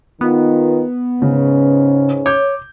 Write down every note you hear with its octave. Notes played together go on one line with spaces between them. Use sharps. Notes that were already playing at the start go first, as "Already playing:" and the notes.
D#3 B3 D#4 F4
G#2 C#3 C#4
C#5 D6 G6